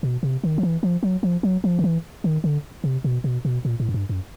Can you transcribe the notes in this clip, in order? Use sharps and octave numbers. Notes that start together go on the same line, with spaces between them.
B2
C3
D#3
F3
E3
F3
F#3
F3
F#3
F3
D#3
E3
D#3
D3
C3
B2
B2
B2
A#2
A2
F#2
G2
F#2